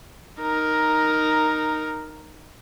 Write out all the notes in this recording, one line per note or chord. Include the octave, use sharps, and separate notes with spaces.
D#4 A#4